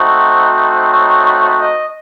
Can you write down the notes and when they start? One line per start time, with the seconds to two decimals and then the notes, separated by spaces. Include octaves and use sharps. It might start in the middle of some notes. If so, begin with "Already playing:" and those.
Already playing: A3 C4 D#4 F#4
0.88 C#5
1.57 D#5